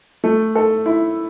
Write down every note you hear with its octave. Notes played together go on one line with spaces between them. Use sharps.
A3
A4
E4